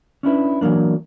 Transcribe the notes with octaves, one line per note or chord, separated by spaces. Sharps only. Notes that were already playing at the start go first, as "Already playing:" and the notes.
C#4 D4 E4 B4
E3 F#3 A3 A#3 D4